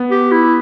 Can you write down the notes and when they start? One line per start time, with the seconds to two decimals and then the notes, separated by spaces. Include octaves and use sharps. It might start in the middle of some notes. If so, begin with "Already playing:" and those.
Already playing: B3
0.11 G4
0.32 E4